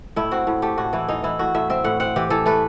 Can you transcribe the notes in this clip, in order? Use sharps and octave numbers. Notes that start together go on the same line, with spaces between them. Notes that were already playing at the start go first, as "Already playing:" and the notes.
A2 E4
C4 F#4
A2
A3 G4
A2 F#4
E3 E4
E3 D#4
E3 E4
A2 F#4
A2 E5
C4 E5
A2 F#5
C4 F#5
E3 G4
E3 A4
A3 B4